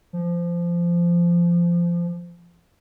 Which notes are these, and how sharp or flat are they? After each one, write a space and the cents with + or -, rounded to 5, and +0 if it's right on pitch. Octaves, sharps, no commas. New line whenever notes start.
F3 -20